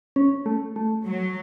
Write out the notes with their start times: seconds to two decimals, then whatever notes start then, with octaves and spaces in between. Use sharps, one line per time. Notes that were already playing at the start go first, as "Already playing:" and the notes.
0.16 C#4
0.46 A3
0.76 A3
1.05 F#3